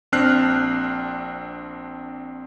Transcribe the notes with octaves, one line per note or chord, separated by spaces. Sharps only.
A#1 C4 D4 F6 F#6 C7